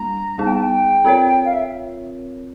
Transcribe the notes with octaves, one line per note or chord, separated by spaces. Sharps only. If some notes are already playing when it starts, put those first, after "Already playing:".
Already playing: G3 A#3 D4 A#5
G3 B3 D#4 G#4 A5
G5
A5
G5
C4 F4 A#4 C#5
F5
E5